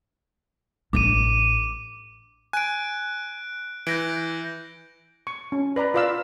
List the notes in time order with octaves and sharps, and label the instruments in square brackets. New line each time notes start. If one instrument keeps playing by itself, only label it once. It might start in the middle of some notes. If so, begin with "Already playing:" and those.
[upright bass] A1 D4 [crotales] D6 D#7
[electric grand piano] G#5 [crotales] F#6 D7
[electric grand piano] E3 [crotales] G6 A#6 D7
[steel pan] C#6
C#4
B4 D5 A#5 B5
F4 B4 D5 F5 E6